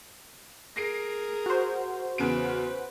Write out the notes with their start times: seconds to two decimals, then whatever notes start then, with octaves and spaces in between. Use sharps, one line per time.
0.76 G#4 A#4 A#6 C7 D7
1.46 F#4 C5
2.18 E2 C#3 B4 D7